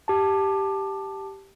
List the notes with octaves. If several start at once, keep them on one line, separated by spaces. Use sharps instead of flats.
G4 A5